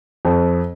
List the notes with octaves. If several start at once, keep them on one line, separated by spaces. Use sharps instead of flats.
F2